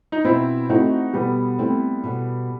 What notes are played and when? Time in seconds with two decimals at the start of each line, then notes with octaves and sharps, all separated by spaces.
0.12 D#4
0.24 B2 C4 E4
0.69 A3 C4 D#4 E4 F#4
1.13 B2 G3 B3
1.58 A3 C4 E4
2.04 B2